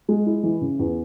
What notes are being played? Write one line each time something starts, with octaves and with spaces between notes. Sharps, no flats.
G#3
E4
E3
C#3
E2